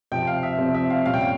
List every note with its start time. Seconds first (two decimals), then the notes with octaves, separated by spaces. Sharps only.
0.12 C3 F3 C4 G5
0.27 F5
0.43 E5
0.58 C3 F3 C4
0.75 E5
0.90 F5
1.05 A#2 G3 C#4 F5
1.14 G5
1.21 F5